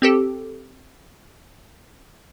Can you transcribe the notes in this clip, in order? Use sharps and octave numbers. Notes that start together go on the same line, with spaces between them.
C4 G4 A4